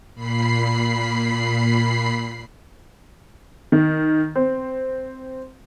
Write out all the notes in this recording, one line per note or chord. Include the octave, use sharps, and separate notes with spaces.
A#2 B5 C7
D#3
C4